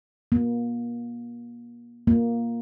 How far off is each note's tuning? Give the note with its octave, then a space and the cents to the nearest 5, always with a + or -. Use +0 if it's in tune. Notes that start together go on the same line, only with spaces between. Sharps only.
A#3 +35
A#3 +5